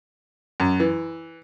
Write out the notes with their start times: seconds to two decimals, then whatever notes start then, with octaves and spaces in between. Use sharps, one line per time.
0.60 F#2
0.80 E3